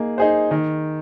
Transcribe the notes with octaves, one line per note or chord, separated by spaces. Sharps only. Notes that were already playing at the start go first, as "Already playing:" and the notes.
Already playing: A#3 D#4 G#4
D#4 G#4 C5
D#3